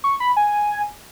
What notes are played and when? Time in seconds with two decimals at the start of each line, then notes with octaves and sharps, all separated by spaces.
0.04 C#6
0.20 B5
0.37 G#5